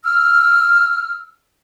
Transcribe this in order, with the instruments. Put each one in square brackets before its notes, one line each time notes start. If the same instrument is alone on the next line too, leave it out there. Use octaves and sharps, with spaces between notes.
[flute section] E6 F6